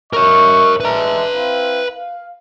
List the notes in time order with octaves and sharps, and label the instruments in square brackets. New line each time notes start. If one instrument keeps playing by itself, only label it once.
[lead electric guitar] A#4 C#5 [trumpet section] D#5 E5 C#6
[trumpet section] G#3 D4 E5 [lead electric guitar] B4 A#5
[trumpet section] C4 E4 F5
F5